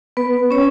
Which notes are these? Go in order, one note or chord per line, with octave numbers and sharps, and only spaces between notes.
B3 B4
C#4 C#5